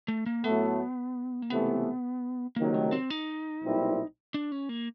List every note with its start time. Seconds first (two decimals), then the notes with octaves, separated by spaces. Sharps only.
0.08 A3
0.26 A#3
0.44 A2 F#3 A3 B3
1.42 A#3
1.50 C#2 C3 E3 A3 B3
2.56 C#2 C3 D#3 F#3 A#3
2.74 A3
2.92 C4
3.10 D#4
3.63 B1 A#2 G3 C4 E4
4.34 D4
4.52 C#4
4.69 A#3